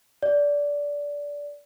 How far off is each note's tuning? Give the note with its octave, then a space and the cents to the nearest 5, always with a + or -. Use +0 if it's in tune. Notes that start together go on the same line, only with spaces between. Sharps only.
D5 -20